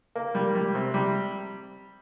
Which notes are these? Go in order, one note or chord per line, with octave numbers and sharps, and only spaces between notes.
A#3
G3
G3
C3
G3